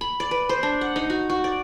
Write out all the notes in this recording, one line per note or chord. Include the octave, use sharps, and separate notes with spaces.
B5
D5
B4
C5
D4
F#5
D#4
F#4
F#4
D5